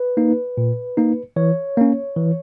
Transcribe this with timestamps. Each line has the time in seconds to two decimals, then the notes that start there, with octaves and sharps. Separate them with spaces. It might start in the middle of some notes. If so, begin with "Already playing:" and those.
Already playing: B4
0.17 A#3 D#4
0.57 A#2
0.97 A#3 D#4
1.36 E3 C#5
1.77 A#3 C#4
2.17 E3